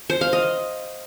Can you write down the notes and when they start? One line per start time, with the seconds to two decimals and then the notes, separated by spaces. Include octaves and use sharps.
0.10 C5
0.21 F5
0.33 D#5